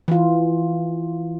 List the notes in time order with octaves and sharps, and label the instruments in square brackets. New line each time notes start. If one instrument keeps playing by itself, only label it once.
[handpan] E3 F4